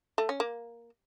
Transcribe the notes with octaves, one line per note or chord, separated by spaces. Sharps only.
A3
C#4
A#3